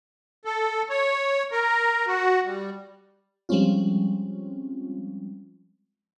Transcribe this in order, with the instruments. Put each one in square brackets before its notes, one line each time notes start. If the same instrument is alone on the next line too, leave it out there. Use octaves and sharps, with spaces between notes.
[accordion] A4
C#5
A#4
F#4
G3
[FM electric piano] F3 G3 G#3 C4 C#4 F4